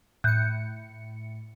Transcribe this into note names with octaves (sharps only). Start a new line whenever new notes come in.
A2 F#6 G6 C#7